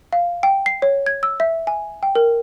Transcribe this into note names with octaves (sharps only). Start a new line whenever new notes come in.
F5
G5
C7
C#5
G#6
E6
E5
G#5
G5
A#4